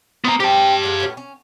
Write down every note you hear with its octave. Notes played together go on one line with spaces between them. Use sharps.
B3 C5 D5 E5 A#5
E3 C4 G4 A5
F#3 G#3 A#3
A2 B3 C#4
C#4